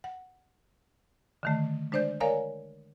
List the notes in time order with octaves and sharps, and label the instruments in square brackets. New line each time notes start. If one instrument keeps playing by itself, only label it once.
[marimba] F#5
D3 D#3 A3
G#3 D4 C5 D5 G6
A#4 C#5 D5 F5 G#5 A#5